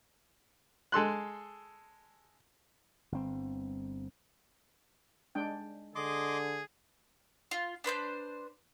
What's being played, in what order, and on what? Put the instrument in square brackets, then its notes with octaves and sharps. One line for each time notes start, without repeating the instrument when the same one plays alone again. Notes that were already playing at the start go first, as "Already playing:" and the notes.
[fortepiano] G#3 A4 C6 F#6
[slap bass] G1 C4
[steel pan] G#3 D4 G5
[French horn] D3 [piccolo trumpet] G#4 [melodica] D#5 C6 D6
[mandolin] F4
D4 B4 C5 G6